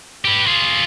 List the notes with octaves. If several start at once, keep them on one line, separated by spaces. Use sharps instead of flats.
G4 B4
F4 G#4